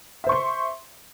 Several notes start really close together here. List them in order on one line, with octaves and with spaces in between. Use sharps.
E5 C5 C#6 C6